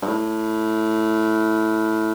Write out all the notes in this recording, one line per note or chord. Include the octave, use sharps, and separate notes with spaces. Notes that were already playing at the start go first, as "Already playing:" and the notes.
G2
A2